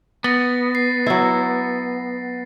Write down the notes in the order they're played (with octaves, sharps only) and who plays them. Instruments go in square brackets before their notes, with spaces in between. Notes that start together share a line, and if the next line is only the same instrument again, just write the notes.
[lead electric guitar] B3 [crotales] A6 A#6
[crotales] C7
[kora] F#3 E4